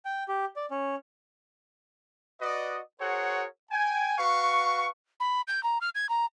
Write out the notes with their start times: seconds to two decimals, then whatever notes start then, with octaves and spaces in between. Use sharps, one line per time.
0.05 G5
0.28 G4
0.56 D5
0.71 C#4
2.41 F#4 B4 D5 D#5
3.00 F#4 G#4 A#4 C5 C#5 F#5
3.71 G5 G#5
4.18 F#4 B4 F5 C#6
5.20 B5
5.48 G6
5.63 A#5
5.81 F6
5.95 G#6
6.09 A#5